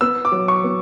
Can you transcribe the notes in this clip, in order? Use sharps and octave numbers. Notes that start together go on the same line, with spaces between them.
B3 E6
D6
F#3
C#6
B3